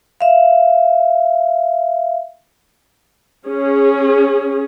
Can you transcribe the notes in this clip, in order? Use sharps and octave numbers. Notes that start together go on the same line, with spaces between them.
E5 F5
C#4 G#4